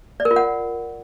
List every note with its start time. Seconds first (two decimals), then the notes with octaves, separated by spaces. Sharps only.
0.20 D5
0.25 A#4
0.31 F4
0.36 F#5